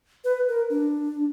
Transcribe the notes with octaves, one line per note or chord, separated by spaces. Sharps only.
B4
A#4
D4